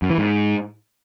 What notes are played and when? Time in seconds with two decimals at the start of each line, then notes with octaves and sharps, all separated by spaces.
0.02 F#2
0.10 E3
0.18 G#2